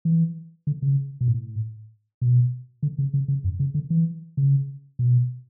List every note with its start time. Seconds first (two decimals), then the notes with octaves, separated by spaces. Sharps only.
0.05 E3
0.67 D3
0.82 C#3
1.21 B2
1.28 A2
2.22 B2
2.83 D3
2.98 C#3
3.14 C#3
3.28 C#3
3.44 F#2
3.60 C#3
3.75 D3
3.90 E3
4.37 C#3
4.99 B2